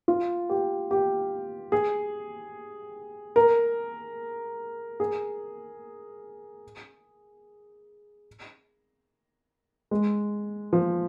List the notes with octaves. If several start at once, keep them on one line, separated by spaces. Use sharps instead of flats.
F4
G4
G4
G#4
A#4
G#4
G#3
F3